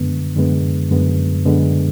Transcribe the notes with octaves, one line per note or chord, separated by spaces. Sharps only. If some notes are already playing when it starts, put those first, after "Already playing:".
Already playing: F#2 D3 G#3 B3
F#2 D3 G#3 B3
F#2 D3 G#3 B3
F#2 D3 G#3 B3